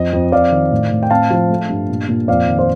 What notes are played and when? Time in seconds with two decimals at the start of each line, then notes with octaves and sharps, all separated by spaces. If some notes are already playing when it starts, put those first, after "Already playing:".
Already playing: F2 D#5
0.13 F2
0.32 F2 D5 F5
0.52 D#3
0.71 A2
0.92 A2
1.03 G5
1.10 C4 F5 A5
1.31 F3
1.50 A3
1.69 G2
1.89 A#2
2.09 A#2
2.28 F2 D5 F5
2.48 D#3
2.59 C5